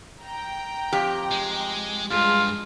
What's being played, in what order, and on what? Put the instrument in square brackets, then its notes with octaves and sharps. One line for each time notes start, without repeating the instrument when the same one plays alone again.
[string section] G5 A#5
[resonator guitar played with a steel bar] F2 G4
[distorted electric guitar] G#3
[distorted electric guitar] G2 [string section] G#3 [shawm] F4